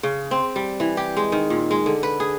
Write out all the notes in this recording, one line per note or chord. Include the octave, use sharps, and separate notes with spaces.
C#3
C4
G3
E3
G4
G#3
D#3
A#2
G#3
D3
B4
G#4